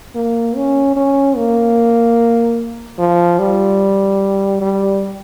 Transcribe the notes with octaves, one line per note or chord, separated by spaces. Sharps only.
A#3
C#4
C#4
A#3
F3
G3
G3